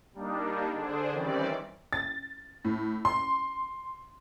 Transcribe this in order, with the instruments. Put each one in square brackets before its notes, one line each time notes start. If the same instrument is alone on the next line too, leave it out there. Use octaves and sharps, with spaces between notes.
[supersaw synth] G3 A#3 D4 D#4
D3 D4 G#4 C5
D#3 E3 G3 C4 C#4 D5
[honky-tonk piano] A6
A2
C6